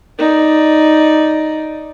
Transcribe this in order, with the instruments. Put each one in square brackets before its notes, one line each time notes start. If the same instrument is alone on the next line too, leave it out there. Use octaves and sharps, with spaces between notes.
[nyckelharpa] D#4 D5